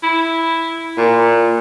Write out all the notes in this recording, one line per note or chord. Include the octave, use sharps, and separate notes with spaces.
E4
A#2